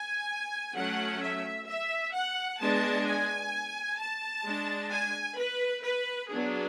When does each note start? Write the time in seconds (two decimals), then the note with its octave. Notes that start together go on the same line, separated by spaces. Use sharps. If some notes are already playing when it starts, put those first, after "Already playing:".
Already playing: G#5
0.74 F#3 A3 C#4 F#5
1.20 E5
1.67 E5
2.13 F#5
2.59 G#3 B3 D4 A5
3.05 G#5
3.98 A5
4.44 G#3 D4
4.91 G#5
5.37 B4
5.83 B4
6.29 F#3 B3 D4 G#4